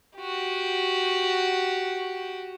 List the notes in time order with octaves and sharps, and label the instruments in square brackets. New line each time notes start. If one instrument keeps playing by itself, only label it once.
[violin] F#4 G4